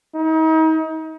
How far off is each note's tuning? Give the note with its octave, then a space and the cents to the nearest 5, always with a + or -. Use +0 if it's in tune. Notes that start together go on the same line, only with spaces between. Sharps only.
D#4 +35